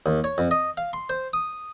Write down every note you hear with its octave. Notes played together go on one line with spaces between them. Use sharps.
D#2
C#5
F2
D#5
F5
C6
C5
D#6